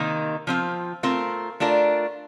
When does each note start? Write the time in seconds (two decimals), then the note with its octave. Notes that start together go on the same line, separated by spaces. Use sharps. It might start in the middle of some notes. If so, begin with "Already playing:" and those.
Already playing: C3 D#3 A#3 D#4
0.47 F3 C4 F4
1.03 A3 C4 F4 A#4
1.60 A3 D4 F4 A#4